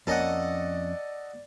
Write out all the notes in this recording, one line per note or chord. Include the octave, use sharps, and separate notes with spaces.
F2 A#3 C#4 A4 D5 D#5 F#5